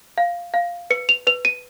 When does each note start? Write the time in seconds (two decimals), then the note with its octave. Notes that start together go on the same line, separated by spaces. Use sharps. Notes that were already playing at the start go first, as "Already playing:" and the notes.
0.18 F5
0.54 F5
0.90 B4 C#7
1.09 F7
1.27 B4 F7
1.45 D#7